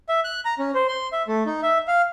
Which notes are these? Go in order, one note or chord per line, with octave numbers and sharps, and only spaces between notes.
E5
F#6
A#5
C#4
C5
C6
E5
A3
D#4
E5
F5